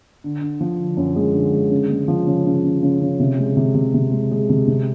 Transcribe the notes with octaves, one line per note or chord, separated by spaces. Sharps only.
D3
D3
F3
D3
F#2
G#3
D3
G#3
C#3
G#3
F3
C#3
C#3
C#3
C#3
C#3
C3
G#3
C3
C3
C3
G#3
G#3
C3
C3